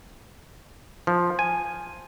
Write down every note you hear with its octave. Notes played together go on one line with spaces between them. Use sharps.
F3
G#5